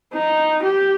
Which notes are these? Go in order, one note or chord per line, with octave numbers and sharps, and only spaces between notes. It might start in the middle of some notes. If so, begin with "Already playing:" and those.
D#4
G4